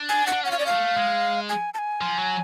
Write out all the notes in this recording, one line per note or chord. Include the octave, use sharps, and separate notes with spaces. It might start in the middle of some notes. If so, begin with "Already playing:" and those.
Already playing: D4
G#5
F#5
D4
C#4 F#5
F5
D5
A3 F5
G#3
G#5
A5
G#5
F3
F#3